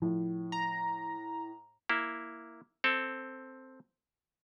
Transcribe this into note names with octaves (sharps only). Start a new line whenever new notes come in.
A2 F3
A#5
A#3 E4
C4 A4